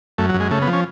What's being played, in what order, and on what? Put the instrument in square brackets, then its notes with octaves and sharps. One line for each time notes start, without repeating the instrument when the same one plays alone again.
[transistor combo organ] F#2 A3
F#3
F#2
G#3
C#3 A3
B3
F3
C#4